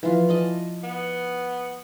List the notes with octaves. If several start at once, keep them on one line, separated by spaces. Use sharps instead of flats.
E3 F3 F4
D5 D#5 A5
B3